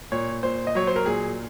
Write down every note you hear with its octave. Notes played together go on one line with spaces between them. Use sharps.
A#2 C#5
A#2 C5
D#5
F#3 C#5
C5
A#4
A#2 G#4